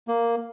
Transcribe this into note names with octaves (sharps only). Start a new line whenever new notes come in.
A#3